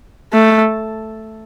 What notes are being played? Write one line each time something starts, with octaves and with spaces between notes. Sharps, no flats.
A3